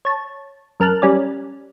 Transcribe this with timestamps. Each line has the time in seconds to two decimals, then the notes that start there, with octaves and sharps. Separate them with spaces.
0.05 C#5 A5
0.80 F#2 A#4 A5 F6 F#6
1.02 G3 C#4 D5